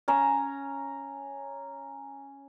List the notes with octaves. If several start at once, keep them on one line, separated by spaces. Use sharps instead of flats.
C#4 A#5